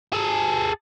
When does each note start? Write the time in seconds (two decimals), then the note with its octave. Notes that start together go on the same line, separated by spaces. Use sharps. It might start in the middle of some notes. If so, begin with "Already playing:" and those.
0.13 G#4 A4